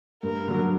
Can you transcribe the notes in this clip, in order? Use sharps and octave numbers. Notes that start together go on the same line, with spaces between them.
G2 A#4
D3 F#3